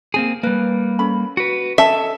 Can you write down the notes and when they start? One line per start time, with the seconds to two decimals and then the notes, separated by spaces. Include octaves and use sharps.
0.14 A#3 C4 G#4
0.43 G3 A#3 B4
0.99 C#4 A4 B5
1.37 F#4 B4
1.78 C#4 A4 D#5 E5 A5